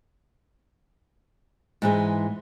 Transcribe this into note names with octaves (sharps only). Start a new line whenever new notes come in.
G#2 E3 G#3